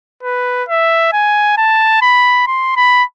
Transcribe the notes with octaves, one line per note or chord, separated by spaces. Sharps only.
B4
E5
G#5
A5
B5
C6
B5